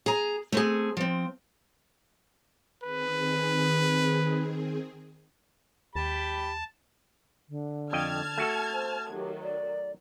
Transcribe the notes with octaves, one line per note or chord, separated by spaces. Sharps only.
G#4 A#5
A3 C4 G#4
F3 C4
D#3 C4 G#4 B4
D#2 G4 A5 B5
D3
F2 D#5 G5 A5 F6 G#6
A3 F#4 A4
C5
D#3 F#3 G4
D5